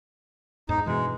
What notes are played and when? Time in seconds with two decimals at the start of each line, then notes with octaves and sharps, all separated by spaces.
0.69 E2 G#2 D#4
0.86 G2 B2 E3 G#3